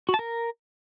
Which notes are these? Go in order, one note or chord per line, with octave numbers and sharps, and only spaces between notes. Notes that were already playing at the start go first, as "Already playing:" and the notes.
F#4
A5
A#4